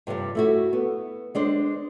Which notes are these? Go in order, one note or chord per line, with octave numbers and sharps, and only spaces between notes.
G2 C3 F3 G3
A3 E4 F#4
B3
G#3 D4 C5